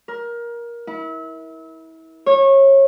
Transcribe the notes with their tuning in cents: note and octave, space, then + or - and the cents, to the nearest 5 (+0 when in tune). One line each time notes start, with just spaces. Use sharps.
A#4 +20
E4 -30
C#5 -25